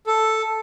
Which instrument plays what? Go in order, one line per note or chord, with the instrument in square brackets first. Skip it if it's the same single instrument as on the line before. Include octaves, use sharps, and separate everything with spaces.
[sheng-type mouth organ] A4